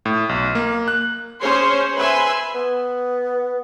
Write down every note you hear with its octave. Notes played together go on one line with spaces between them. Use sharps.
A2
B1
A#3
F#6
C#4 G#4 C5 C#5 C6
B4 E5 G#5 C6
B3